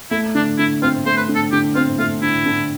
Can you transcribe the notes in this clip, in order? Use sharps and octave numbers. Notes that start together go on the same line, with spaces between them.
A3 E4
D3 D4
D3 E4
C4 F4
A3 C5
B4
D3
A4
D3 G4
C4 F4
A3 F4
D3 E4
D3